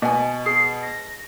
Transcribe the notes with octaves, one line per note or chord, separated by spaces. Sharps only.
B2 D#5 G#5
G#4 C7
A#6